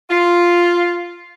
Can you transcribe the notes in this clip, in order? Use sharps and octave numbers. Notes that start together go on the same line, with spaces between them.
F4